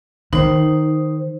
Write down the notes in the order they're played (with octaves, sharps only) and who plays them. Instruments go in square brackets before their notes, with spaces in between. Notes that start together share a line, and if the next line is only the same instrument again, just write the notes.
[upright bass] D#3 [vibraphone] D#4 C5